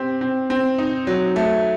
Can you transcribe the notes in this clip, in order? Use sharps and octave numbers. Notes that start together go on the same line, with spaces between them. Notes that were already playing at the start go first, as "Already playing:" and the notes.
Already playing: C4 G4
C4
C4
D#4
F#3
A3